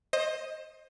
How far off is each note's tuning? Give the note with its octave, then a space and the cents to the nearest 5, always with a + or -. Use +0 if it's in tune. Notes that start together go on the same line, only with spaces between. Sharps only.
C5 +25 D#5 +0